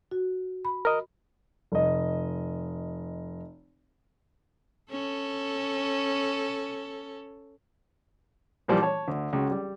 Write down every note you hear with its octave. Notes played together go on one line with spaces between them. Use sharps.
F#4
B5
A#4 D#5
F1 D#5
C#4 A4
A#2 E3 F3 G3 A#3
C#5 A5
D2
C#2 F#4
G3